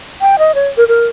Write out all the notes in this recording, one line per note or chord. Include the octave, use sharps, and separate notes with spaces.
G5
D#5
C#5
A#4
A#4